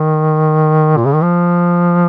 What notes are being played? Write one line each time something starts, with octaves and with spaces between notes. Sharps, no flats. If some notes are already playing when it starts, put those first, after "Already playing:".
Already playing: D#3
A#2
C#3
D#3
F3